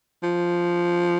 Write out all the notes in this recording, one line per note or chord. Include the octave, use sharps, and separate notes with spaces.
F3